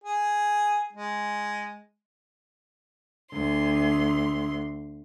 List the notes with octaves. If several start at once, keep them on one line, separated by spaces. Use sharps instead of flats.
G#4
G#3
D2 C6